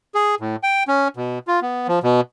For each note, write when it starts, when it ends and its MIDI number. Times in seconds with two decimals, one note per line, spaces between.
0.15 0.35 68
0.40 0.56 45
0.63 0.83 79
0.88 1.08 61
1.16 1.39 47
1.47 1.60 65
1.62 1.87 59
1.88 1.99 53
2.03 2.21 47